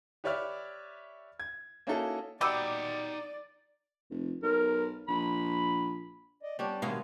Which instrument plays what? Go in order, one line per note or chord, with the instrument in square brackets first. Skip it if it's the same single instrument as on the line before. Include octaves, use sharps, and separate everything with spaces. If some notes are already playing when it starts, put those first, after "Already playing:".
[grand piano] G4 B4 C#5 D5 E5 F6
G#6
A#3 C#4 D#4 E4 F#4 A4
[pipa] B2 G4 [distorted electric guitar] D#4 F#5 [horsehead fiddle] D5 [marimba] B5 E6
[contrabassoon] F1
[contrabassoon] B1 [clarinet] A#4
[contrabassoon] A#1 [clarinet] B5
[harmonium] D5 D#5
[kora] G3 C#4 D4 [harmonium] B3 D5
[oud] B2 G#3 F5 [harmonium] D#3 A3 [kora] B3